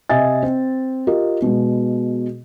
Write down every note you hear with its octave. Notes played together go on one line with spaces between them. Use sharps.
C3 D#5 E5 G#5 A6
C4
F4 G4 A#4 D#5
B2 G#3